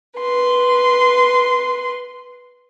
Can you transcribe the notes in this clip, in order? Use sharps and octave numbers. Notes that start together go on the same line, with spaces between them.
B4 C6